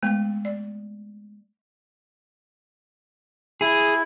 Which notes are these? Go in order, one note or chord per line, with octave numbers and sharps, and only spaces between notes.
G#3 A3 B3
D5
E4 G#4